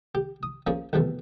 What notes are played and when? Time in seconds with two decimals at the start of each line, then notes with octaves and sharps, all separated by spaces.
0.15 G4
0.43 D#6
0.67 F3 A#3 C#4 G#4
0.93 B1 E2 C3 E3 A3